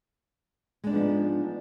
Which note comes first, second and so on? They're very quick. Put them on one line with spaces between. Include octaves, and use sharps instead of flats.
G#3 D4 D#4 B3 F3